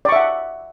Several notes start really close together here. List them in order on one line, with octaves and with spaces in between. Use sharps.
D5 C#6 E5 F#5